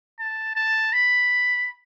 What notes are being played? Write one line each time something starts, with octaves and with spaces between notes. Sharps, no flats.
A5
A5
B5